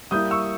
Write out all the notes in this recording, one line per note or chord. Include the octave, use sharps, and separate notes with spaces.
G3 A#3 E4 D#6 G6
C#6 E6